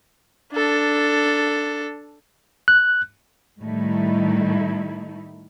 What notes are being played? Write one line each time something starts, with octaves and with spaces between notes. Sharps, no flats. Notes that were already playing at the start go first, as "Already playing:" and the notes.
D4 A4
F#6
A2 D#3 G3 A3 D#4 E4